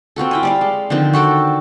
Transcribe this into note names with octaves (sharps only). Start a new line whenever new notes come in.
C4 F4 F#4 A4
E4 G5 G#5
G3 D5 F5
G#3
D3 D#3 F3 C4
F#4 A4 G5 A5